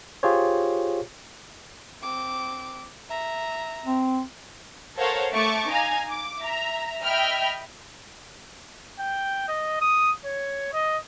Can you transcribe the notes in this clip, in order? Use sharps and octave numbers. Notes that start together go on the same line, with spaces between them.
F4 G4 G#4 C5 C#5
C4 D6
E5 A#5
C4
A4 A#4 C5 C#5 F5 F#5
A3 A5 C#6 D6
D#4 F5 G#5 A#5
D6
E5 A#5
D#5 E5 G5 B5 F6
G5
D#5
D#6
C#5
D#5